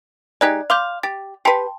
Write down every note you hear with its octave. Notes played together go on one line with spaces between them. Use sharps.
G#3 D#4 G4 D5 F#6 G#6
F5 C6 D6 G6
G4 A6
G4 B4 G5 A5 C6